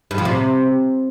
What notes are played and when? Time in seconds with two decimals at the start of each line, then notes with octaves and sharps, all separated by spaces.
0.11 G2
0.18 F3
0.25 C3